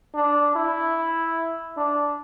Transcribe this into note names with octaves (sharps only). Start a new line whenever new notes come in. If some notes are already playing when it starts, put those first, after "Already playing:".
D4
E4
D4